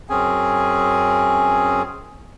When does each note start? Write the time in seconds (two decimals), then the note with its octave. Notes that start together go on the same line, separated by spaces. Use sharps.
0.10 F#2 C4 C#4 G#4 G#5